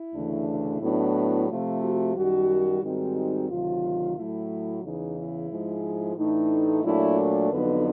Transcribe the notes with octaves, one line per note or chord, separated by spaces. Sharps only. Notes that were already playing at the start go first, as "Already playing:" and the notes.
Already playing: E4
D2 C#3 E3 A3 D4
E4
A2 F#3 B3 D4
C3 F3 A3 F4
F#4
F#2 D#3 G3 F#4
G#2 D#3 G3 C4 D#4 F#4
D2 C3 D#3 F#3 F4
A2 F#3 A3 E4
E2 C#3 E3 D#4
E4
G#2 F3 G#3
A2 E3 A3 D4 D#4
A#2 F#3 A3 D4 E4
A#4
F2 D3 F#3 B3 D#4 B4